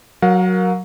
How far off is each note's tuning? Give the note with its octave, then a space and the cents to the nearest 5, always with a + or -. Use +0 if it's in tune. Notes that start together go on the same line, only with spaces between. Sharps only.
F#3 +0 A#4 +5 F5 +45